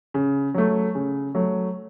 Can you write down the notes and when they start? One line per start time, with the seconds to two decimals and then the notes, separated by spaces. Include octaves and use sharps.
0.14 C#3
0.54 F#3 A3
0.95 C#3
1.35 F#3 A3